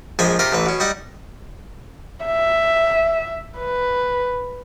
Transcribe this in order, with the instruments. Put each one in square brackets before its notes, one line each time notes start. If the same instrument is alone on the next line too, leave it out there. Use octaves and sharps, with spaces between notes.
[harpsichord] A#1 F3 G#3 G5 G#5 B5
C3 F4 G4 A#4 B5
A1 E3 B4
B2 C#4
G3 D#4 F#5
[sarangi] E5
B4